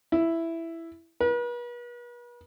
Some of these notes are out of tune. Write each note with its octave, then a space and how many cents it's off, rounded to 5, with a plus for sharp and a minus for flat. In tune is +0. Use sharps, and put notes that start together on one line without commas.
E4 +5
B4 -40